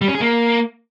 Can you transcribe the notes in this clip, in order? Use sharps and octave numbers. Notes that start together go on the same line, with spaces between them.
G3
C#4
G#4
A#3